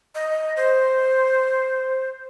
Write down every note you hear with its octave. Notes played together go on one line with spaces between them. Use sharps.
D#5
C5